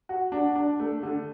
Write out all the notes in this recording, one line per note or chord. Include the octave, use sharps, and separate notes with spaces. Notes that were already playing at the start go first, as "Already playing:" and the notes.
F#4
D4
D4
A3
D3